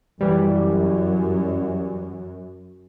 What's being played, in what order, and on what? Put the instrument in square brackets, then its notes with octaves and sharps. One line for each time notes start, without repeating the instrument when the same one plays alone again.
[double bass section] F#2 [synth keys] E3 G3